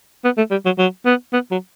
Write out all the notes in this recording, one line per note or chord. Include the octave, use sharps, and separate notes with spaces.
B3
A3
G3
F#3
F#3
B3
B3
F#3